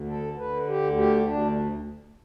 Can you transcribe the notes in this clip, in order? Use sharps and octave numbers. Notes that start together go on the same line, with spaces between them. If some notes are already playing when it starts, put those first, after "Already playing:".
Already playing: D2 D3
A4
D3 B4
G4
D2
G4
D2 D4